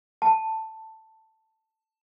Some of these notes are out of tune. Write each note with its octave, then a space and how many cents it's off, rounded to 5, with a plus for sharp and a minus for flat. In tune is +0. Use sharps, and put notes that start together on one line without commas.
A5 +10